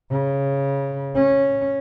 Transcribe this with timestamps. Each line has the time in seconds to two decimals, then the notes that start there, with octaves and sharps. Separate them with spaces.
0.10 C#3
1.15 C#4